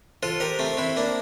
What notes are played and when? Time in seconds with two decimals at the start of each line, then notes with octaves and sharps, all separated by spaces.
0.23 F4 A4 C5
0.40 G4 A#4 C5
0.59 A3 C4 C5
0.77 C4 E4 C5
0.97 A#3 D4 C5